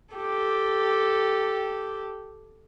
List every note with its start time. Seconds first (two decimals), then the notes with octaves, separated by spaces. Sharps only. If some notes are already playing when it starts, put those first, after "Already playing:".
0.14 G4 A4